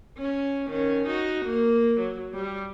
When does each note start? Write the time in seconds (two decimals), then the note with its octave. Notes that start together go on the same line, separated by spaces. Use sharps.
0.17 C#4
0.67 D#3 C#4
1.07 D#4 F#4
1.45 A#3
2.00 F#3
2.34 G3